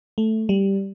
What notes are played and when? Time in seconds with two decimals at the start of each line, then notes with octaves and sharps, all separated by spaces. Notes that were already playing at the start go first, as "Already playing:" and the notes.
0.18 A3
0.49 G3